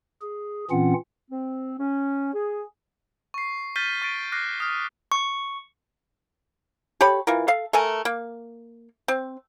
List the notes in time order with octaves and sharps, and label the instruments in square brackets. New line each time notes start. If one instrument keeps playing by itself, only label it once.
[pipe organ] G#4
A#2 E3 C4 C#4 F4 F#5
[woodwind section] C4
C#4
G#4
[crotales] C#6 C7
F6 G6 A6 B6 D#7 G7
C#6 A6 D7
D6 F6 F#6 A#6 C7
D#6 F6
[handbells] C#6
[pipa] G4 A4 C#5 B5
E3 F4 A#4
A4 F5
A3 A4 A#4 G#5
A#3
C4